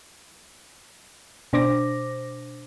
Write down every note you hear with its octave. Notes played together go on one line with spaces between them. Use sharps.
B2 D4 C5 D6 A#6